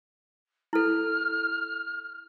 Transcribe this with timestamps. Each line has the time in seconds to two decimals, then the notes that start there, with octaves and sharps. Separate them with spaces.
0.73 E4 A4 F6